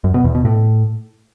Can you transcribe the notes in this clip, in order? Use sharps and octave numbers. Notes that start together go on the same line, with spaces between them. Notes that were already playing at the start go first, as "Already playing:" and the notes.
F#2
B2
E2
B2
A2